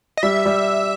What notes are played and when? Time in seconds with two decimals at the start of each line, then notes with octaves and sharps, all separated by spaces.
0.17 D#5
0.23 G3 E5
0.46 G3